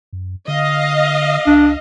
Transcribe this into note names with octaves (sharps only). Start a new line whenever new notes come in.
F#2
D3 D#5 F5
C#2 D4